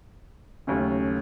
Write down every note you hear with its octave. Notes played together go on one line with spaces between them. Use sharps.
D#2 C#3 F#3 A3 C#4